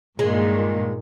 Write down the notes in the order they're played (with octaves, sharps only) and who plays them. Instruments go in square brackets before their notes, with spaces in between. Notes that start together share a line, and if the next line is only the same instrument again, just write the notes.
[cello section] G2 A#2 D#3 [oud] G#3